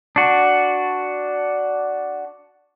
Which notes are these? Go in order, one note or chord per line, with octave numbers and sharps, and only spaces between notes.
D4 F#4